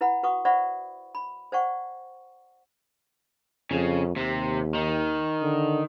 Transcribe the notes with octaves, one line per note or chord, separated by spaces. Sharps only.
E4 B4 F#5 B5
F#4 B4 F#5 C#6 D#6
C5 D5 E5 F#5 B5 C#6
B5
C5 D5 F#5 G5 C#6
F2 C#3
D#2 C3
D#3
D3